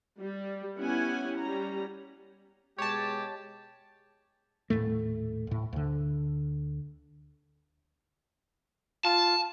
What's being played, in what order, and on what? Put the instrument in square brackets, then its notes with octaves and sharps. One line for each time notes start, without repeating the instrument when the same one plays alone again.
[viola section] G3
B3 C#4 E4 G4 F#5 G#5
G3 C#4 A#5
[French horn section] B2 G#3 [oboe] G4 [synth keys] C#5 A5
[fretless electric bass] D#1 C#2 A2 A3
D#1 A2
D2 D3
[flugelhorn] F4 [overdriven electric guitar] A5